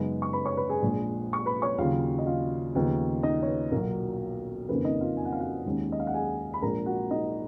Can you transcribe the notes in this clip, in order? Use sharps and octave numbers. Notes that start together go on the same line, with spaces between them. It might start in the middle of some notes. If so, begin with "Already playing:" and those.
Already playing: F#2 C#3 G#3 B3 D#4 B4
C#6
B4 B5
C#5 C#6
B4 B5
G#4 G#5
A#1 A#2 G#3
C#6
B4 B5
C#5 C#6
D#2 C#3 F#3 F4 F5
D#5
F4 F5
D#2 C#3 F3 B3 D#4
D#4 D#5
C#5
B4
B1 A#2 F#3 A#4
F#1 F2 D#3 A#3 C#4 B4
D#4 D#5
F4 F5
G#5
F#5
F5
F#4 F#5
D#2 D#3 G#3 C#4
D#5
F5
F#5
G#4 G#5
B5
A#1 A#2 G#3 A#4 A#5
F#4 F#5
D#4 D#5